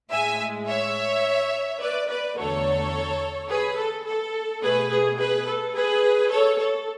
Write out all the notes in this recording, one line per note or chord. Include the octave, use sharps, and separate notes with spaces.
A2 G#3 E5 G#5
C#5 E5
B4 D5
B4 D5
E2 D3 F#3 A3 A4 C#5
G#4 B4
A4
A4
B2 A3 G#4 B4
G#4
G#4 B4
A4
G#4 B4
A4 C#5
A4